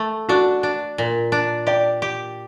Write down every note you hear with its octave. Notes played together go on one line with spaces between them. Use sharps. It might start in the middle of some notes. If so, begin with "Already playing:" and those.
Already playing: A3
D4 F#4
D4
A#2
D4
G4 D5
G4